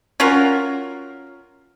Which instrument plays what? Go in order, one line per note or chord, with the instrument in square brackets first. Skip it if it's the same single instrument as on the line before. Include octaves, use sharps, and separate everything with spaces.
[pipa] C#4 F4 F#4 A#4